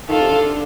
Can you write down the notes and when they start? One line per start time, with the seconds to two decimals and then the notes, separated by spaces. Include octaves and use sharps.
0.08 D#3 F4 A4
0.21 C3
0.30 D3